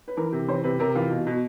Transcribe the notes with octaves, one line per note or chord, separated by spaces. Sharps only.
B4
E3 A#4
C3
E3 C5
C3 B4
C3 A#4
E3 F4
B2
B2